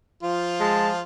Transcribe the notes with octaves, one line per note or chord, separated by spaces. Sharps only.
F3 F4
G#3 A5